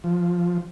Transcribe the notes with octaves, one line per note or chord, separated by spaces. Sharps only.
F3